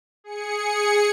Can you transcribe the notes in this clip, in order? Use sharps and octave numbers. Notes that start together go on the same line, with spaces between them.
G#4 C#7